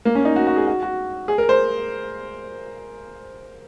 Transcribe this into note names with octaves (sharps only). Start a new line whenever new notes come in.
A#3
C#4
D#4
F#4
F#4
G#4
F#4
F#4
G#4
A#4
C5